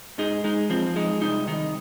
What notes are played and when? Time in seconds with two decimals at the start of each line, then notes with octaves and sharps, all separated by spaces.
0.18 G#2 D#4 G#4
0.44 G#3 D#4
0.70 F3 C4
0.96 G#3 D#4
1.22 C2 D#4
1.48 D#3 D#4